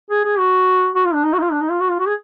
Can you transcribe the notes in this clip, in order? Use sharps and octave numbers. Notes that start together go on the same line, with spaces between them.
G#4
G#4
F#4
F#4
F4
D4
D#4
F#4
D#4
F4
D4
D#4
F4
F#4
F4
F#4
G#4